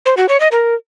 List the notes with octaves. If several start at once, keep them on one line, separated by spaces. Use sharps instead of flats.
C5
F#4
C#5
D#5
A#4